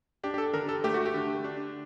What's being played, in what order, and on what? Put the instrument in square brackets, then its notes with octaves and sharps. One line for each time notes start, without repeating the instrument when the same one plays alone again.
[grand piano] D4 [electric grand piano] G4
[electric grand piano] G4
A4
[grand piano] D3 [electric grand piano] A#4
[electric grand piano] A4
[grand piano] A3 [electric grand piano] G4
[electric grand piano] F#4
G4
[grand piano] D3
D4